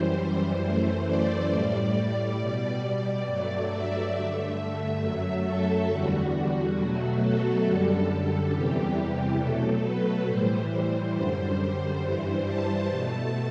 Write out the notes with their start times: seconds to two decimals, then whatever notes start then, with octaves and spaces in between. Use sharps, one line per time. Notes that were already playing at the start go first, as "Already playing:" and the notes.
Already playing: F#2 E3 G3 C5
0.63 F#2 E3 A3
1.07 D5
1.51 A2 G3
2.38 B2 G3
2.82 D5
3.26 G2 F#3 A3
3.70 E5
4.14 G2 D3 A3
4.58 E5
5.01 F#2 F#3 A3
5.45 A4
5.88 E2 D3 G3 F#4
6.77 B2 F#3 A3
7.21 A4
7.64 F#2 D3 G3
8.08 A4
8.51 E2 C3 E3 G3 G4
9.39 B2 F#3 A3 A4
9.83 B4
10.27 A2 E3 G3 C5
11.14 F#2 D3 G3 C5
12.02 G2 E3 G3
12.46 A5
12.90 B2 A3 A5